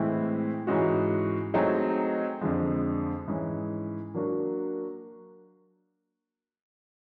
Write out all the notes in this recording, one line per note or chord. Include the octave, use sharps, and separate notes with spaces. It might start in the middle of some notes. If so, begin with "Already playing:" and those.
Already playing: A2 E3 G#3 C4 E4
G#2 E3 G#3 C#4 F#4
F#3 A3 C4 D#4 G#4
F2 D3 F3 G#3
G#2 E3 G#3 C#4 E4
F#3 A#3 D4 F#4 A#4